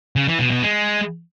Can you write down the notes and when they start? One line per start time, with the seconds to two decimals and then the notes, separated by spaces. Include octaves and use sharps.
0.16 C#3
0.28 E3
0.39 B2
0.51 B2
0.63 G#3